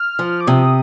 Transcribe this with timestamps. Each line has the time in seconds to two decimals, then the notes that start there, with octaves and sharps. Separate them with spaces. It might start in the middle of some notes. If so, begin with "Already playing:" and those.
Already playing: F6
0.19 F3
0.41 D6
0.47 C3 D#6